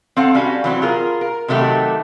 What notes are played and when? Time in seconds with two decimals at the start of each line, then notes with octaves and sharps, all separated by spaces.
0.16 C4 A4 F5 F#5
0.34 G3 C#4 F#4 F5
0.64 E3 F#3 C4
0.82 F4 G#4 A#4
1.21 A#4
1.48 C3 D#3 F#3 A3 G4